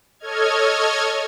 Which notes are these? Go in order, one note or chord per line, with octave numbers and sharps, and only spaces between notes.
A4 C#5 D#5 F6 G#6